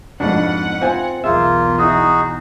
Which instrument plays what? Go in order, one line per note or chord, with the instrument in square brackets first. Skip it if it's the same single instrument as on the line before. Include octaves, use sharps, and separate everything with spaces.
[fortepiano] F2 G#2 [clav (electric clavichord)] D4 F#4 [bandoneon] B4 [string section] F#5
[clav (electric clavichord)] C4 [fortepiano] F4 G#5
[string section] B1 E2 [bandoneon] A#3 F4 [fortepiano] G#4 [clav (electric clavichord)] E5
[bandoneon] D#4 F#4 G#4 [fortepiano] E4 D#6